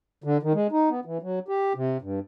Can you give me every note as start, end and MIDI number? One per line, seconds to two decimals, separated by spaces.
0.24 0.37 50
0.43 0.53 51
0.54 0.67 56
0.72 0.89 63
0.90 1.00 59
1.05 1.18 52
1.22 1.39 54
1.48 1.73 67
1.75 1.97 48
2.02 2.20 43